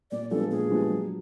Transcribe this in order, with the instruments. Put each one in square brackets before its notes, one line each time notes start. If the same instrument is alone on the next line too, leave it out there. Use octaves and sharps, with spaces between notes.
[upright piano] A#2 [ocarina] D5
[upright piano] F3 G#3 B3 D4 [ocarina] A4
[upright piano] A#2 [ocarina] G#4
[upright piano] F3 G#3 B3 D4
F#3